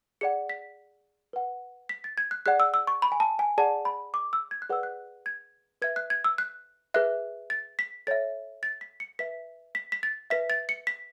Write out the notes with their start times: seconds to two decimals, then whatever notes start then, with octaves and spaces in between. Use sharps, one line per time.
0.21 G#4 D5 F#5 C#7
0.49 B6
1.33 B4 F#5
1.89 B6
2.04 A6
2.18 G#6
2.31 F#6
2.46 G#4 D5 F#5 F#6
2.60 E6
2.74 E6
2.87 C#6
3.02 B5
3.12 G#5
3.20 A5
3.39 G#5
3.58 G#4 D5 F#5 A5
3.85 B5
4.14 D6
4.33 E6
4.51 G#6
4.62 F#6
4.70 G#4 B4 D5 F#5 E6
4.83 F#6
5.26 G#6
5.82 B4 E5 G#6
5.96 F#6
6.10 G#6
6.24 E6
6.38 F#6
6.94 G#4 B4 E5 F#6
7.50 A6
7.79 B6
8.07 A4 C#5 E5 A6
8.63 A6
8.81 B6
9.00 C#7
9.19 B4 E5 B6
9.75 B6
9.92 B6
10.03 A6
10.30 B4 E5 B6
10.50 A6
10.69 C#7
10.87 B6